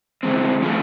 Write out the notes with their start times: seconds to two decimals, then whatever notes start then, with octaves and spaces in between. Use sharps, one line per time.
0.23 E3 G#3 C4
0.62 E3 A3 C#4 F4